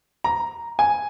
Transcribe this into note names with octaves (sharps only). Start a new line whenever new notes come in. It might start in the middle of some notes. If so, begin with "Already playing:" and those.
A#5
G#5